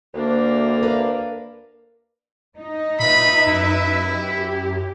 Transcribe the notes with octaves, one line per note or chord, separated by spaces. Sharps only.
D2 A#3 D4
A#4 B4 F5
D#4
A#2 B4 E5 B5
F#2 E4
G4